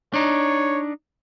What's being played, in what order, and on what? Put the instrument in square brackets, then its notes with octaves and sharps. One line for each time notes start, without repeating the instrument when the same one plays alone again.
[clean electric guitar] D4 D#4 [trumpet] C#5